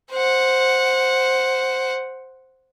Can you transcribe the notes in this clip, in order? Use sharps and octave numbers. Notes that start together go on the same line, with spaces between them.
C5 F#5